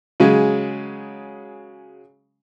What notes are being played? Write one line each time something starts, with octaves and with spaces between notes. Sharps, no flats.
C#3 F#3 G#3